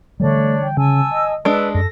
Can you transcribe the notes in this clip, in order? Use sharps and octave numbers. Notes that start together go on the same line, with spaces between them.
D3 E3 G3 A3 D4 C#5 D5
G5
C#3 G#5 A5 E6
D#5
G#3 D4 B4 A5 E6
F#2 A4 A#6